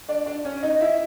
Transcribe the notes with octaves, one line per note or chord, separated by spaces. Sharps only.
D4 D5
D4 D5
C#4 C#5
D#4 D#5
E4 E5